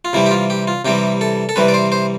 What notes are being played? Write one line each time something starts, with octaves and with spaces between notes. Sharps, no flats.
F4
C3 E3 G3 C4 E4
G4
F4
G4
F4
C3 E3 G3 C4 G4
A4
A4
C3 E3 G3 C4 B4
D5
C5
C5